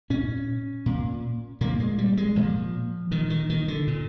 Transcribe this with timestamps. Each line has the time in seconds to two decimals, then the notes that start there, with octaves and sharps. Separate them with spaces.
0.10 A#2 C#4
0.86 A#2
1.61 A#2 A#3
1.80 G#3
1.98 G3
2.17 G#3
2.36 A#2 F3
3.11 A#2 D#3
3.30 D#3
3.50 D#3
3.68 D3
3.87 A#2